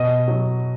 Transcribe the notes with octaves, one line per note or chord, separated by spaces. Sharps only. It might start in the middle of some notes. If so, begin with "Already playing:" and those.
Already playing: B2 D#5
F#3